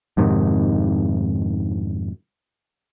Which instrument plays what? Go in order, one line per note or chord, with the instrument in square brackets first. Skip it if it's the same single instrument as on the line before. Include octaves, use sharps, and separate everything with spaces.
[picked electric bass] F2 G#2 C3 D#3